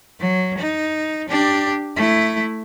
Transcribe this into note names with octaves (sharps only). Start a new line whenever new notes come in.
F#3
D#4
D4 G4
A3 E4